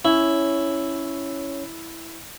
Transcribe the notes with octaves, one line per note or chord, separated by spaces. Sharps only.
C#4 E4 C#5